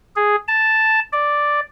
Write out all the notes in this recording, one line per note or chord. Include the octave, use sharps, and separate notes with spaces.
G#4
A5
D5